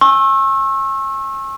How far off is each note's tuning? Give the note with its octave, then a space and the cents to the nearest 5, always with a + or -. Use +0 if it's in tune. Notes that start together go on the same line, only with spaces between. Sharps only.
G#5 +0 C#6 -40 E6 +0